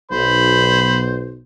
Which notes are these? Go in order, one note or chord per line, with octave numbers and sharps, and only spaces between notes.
B1 C5 B5